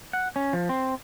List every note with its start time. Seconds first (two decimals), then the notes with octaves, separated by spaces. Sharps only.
0.13 F#5
0.36 C#4
0.53 F3
0.69 C4